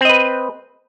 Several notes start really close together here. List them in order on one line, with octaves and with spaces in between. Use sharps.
C4 D#5 B4